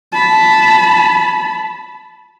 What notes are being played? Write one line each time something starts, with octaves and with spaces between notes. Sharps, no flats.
A5 B5